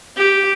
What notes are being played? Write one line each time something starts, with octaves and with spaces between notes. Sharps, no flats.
G4